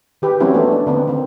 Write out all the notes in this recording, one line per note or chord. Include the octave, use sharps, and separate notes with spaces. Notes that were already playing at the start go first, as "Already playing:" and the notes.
D#3 G4 B4
F3 G3 C4 C#4 E4 F#4
E3 A3 B3 D4
B3 D4
D3 B3 C4
D#3 C4